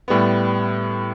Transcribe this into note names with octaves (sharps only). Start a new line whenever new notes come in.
A2 G3 B3